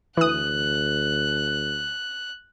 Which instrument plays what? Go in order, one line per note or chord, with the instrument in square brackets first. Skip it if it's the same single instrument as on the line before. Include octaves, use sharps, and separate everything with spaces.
[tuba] D2 [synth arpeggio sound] E3 D#6 [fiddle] F#6